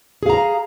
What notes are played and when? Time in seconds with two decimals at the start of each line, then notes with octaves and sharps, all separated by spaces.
0.23 G#4
0.26 F5
0.30 A#5